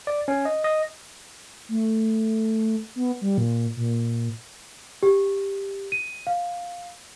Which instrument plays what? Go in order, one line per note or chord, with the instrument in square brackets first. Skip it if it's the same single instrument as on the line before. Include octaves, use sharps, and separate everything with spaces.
[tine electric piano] D5
C#4
D#5
D#5
[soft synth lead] A3
B3
G3
A#2
A#2
[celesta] G4
D#7
F5